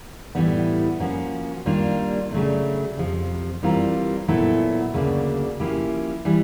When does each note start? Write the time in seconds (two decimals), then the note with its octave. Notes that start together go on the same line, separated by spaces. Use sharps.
0.35 A2 E3 G3 B3
1.00 F3 A#3 C#4 F#4
1.66 D#3 G3 A#3 D4 F4
2.31 C#3 F#3 A3 D4
2.97 F2 C3 F3
3.63 E3 G3 C4 F4 A#4
4.28 A#2 F#3 B3 E4 A4
4.94 D2 C#3 F#3 A#3 D4
5.60 F3 A#3 C#4 E4 G4
6.25 E3 G3